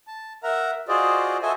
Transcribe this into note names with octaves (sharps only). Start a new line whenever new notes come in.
A5
A#4 E5 F#5 A#5
F4 F#4 G#4 C5 D5 D#5
F#4 A4 C5 D#5 E5 G#5